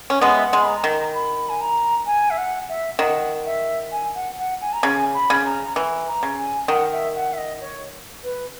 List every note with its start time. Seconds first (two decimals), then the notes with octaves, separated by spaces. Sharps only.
0.10 C#4
0.21 G#3 B3 F#5
0.34 E5
0.46 F#5
0.53 G#3
0.61 B5
0.67 A#5
0.84 D#3
1.14 B5
1.49 G#5
1.61 A#5
2.06 G#5
2.30 E5
2.37 F#5
2.69 E5
2.98 D#3 F#5
3.45 E5
3.91 G#5
4.15 F#5
4.38 F#5
4.61 G#5
4.73 A#5
4.83 C#3 G#5
5.14 B5
5.30 C#3
5.45 A#5
5.76 E3
6.08 A#5
6.23 C#3
6.38 G#5
6.68 D#3 F#5
6.92 E5
7.15 F#5
7.33 E5
7.37 D#5
7.61 C#5
8.23 B4